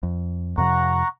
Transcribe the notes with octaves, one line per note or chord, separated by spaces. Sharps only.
F2
F2 C3 F3 F#5 A#5 C#6